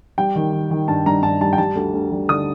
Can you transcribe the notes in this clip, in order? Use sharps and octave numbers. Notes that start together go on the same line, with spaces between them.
G3 G5
D#3
D#3
D#3
G2 A5
G2 A#5
G2 A5
G3 A5
G5
G3 A5
D2
D2
G3
D3 D#6